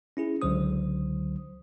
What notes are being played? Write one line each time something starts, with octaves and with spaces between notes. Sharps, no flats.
C#4 E4 G#4
C#2 D3 F#3 C5 D#6